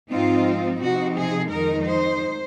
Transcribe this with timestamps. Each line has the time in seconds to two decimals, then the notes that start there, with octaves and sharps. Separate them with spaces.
0.10 G#2 F3 C4 D#4 F4
0.81 C3 F3 C4 D#4 F#4
1.16 G#4
1.51 F2 D#3 G#3 D#4 A#4
1.86 C5